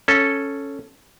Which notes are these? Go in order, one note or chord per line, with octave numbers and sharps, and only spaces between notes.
C#4 A4